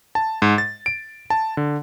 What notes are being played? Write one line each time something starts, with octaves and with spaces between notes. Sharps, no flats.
A5
G#2
A6
D7
A5
D3